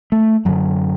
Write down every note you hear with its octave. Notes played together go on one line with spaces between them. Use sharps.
A3
F#2 D3 F#3